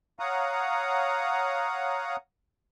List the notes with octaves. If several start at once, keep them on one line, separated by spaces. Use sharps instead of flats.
C#5 F5 F#5 A#5 D#6